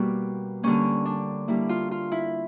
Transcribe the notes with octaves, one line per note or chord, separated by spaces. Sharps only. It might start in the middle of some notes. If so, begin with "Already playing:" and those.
Already playing: B2 G3 A#3
D3 G3 A#3 C#4
D4
D3 G3 A#3 E4
F4
F4
E4